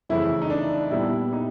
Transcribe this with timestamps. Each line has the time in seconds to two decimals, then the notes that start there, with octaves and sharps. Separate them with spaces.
0.09 F2 C#3 E3 A3 E4
0.42 D#4
0.50 D4
0.91 A#2 G3 B3 E4
1.33 D#4